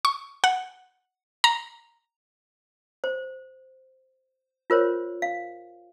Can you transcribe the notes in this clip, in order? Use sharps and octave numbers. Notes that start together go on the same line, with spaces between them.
C#6
F#5
A#5
C5
F4 A#4 C5 C#5
F5